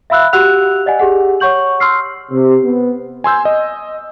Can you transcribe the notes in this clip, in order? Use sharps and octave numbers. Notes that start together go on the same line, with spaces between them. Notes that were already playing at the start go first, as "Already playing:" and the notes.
E5 F5 B5 E6 F#6
F#4 G4 F#5 E6 F#6 F7
D5 D#5 F#5 G#5
G4 G#4 F#5
C#5 F#5 C#6 G6 F#7
C6 E6 F6 C7
C3
B3
G#5 C6 E6 G6
D#5